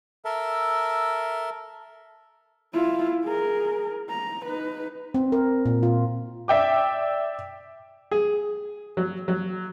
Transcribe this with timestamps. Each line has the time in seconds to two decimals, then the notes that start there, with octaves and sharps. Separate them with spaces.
0.25 A4 A#4 E5
2.74 E4 F4
3.24 G#4 A#4
4.09 A#5
4.45 D#4 B4
5.14 C4
5.32 A#4
5.65 A#2
5.83 F4
6.48 D5 E5 G5 D6
8.11 G#4
8.97 F#3
9.28 F#3